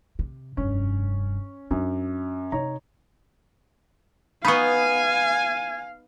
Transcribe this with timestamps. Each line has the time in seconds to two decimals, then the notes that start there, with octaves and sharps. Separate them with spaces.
0.19 C3
0.57 F1 G2 C#4
1.71 F#2 D4
2.52 C3 D#4 C#5 A#5
4.45 B3 D#4 F5 G#5 B5 C#6